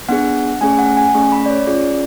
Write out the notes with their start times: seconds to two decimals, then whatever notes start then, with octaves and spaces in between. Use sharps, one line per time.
0.09 B3 D4 G#4 F#5
0.61 A3 C#4 G#4 G#5
0.79 F#5
0.97 G#5
1.14 A3 C#4 G#4 C#6
1.32 B5
1.46 D5
1.50 C#5
1.67 C#4 F4 G#4 D5